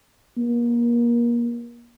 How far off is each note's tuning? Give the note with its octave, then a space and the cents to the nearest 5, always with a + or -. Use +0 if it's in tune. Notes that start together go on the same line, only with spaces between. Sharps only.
A#3 +30